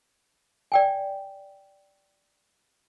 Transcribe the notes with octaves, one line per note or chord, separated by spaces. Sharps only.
D5 G5 G#5